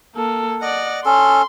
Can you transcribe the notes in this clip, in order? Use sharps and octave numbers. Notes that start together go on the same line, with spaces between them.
A#3 A4
D5 D#5 F#5
C#4 A4 C6